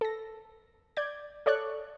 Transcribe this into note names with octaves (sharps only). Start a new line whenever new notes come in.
A4 A#6
D5 G6 G#6
A4 C#5 D5 C#6 F#6